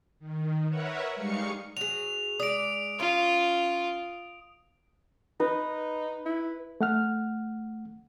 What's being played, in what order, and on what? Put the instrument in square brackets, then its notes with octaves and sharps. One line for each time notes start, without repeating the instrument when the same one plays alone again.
[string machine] D#3
A#4 B4 C#5 E5 F#5
G3 G#3 D#4 F5 C#6 C#7
[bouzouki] F#3 G#4 [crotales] F7
[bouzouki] G#3 D5 [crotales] D#6 D7
[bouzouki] C#4 [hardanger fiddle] F4
[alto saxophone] D#4 [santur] B4
[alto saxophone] E4
[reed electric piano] A3 F#5 F6